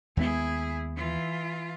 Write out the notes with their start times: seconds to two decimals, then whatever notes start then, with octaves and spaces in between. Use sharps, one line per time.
0.17 D#2 G#3 B3 E4 G#4
0.96 E3 F4